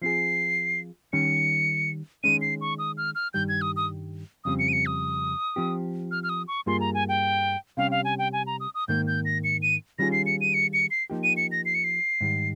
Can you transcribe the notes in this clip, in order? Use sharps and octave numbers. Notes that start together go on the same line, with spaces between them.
F3 C4 F4 G#4 C7
D#3 G3 C#4 C#7
D#3 G#3 C#4 D#7
C7
C#6
D#6
F6
F6
G2 D#3 G3 G6
G#6
D#6
D#6
F2 C#3 G3 C4 D#6
C#7
D#7
C#7
D#6
F3 C4 G4
F6
F6
D#6
C#6
G2 G3 A#3 F4 G#4 C6
A#5
G#5
G5
C3 G3 C#4 G4 F5
F5
G#5
G5
G#5
A#5
D#6
D#6
G#2 D#3 A#3 G6
G6
A#6
C#7
D#7
D#3 G3 C#4 F4 G#4 A#6
C7
C#7
D#7
C#7
C#7
C7
F3 A#3 D#4 G4
D#7
C#7
A#6
C7
C#7
C7
G#2 D#3 G3